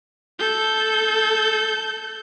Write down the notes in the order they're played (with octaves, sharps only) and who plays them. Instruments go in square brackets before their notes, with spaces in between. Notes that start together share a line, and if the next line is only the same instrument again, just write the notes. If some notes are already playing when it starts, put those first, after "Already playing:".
[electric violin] A4 G6